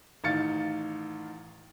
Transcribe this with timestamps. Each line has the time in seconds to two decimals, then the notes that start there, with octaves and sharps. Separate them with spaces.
0.24 A1 D#3 F5 A6 C#7